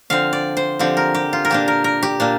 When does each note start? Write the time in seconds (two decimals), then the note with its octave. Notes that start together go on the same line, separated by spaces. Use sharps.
0.10 D3 F3 C4 F5
0.33 D5
0.57 C5
0.79 D3 F3 C4 G4
0.97 A#4
1.15 G4
1.33 F4
1.45 A#4
1.50 A#2 A#3 D4 G4
1.68 A#4
1.84 A#4
2.03 G4
2.20 A#2 A#3 D4